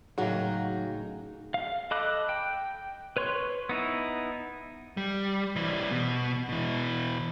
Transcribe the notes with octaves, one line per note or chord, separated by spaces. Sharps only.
A2 C#3 F#3 A#3 D#4 F#4 G#4
F5
A4 D#5 B5 D6 F#6
G5
B4 C#5 C6 C#6
B3 D#4 E4
G3
E3 G3
B2
B2 E3